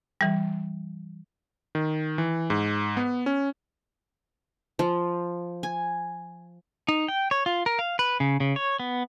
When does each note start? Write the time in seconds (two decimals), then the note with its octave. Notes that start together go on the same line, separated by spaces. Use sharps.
0.21 E3 G3
1.75 D#3
2.18 E3
2.50 G#2
2.97 B3
3.26 C#4
4.79 F3
5.63 G#5
6.88 D#4
7.08 G5
7.31 C#5
7.46 F4
7.66 A#4
7.79 F5
7.99 B4
8.20 C#3
8.40 C#3
8.56 C#5
8.80 B3